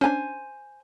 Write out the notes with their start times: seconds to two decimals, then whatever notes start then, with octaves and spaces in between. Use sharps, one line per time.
0.01 C#4 D4 C5 G#5